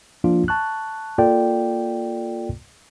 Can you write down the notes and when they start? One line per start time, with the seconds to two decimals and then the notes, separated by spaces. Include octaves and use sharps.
0.24 F3 A#3 D4 F4
0.48 A5 C#6 F#6
1.18 A#3 F4 A4 D5 G5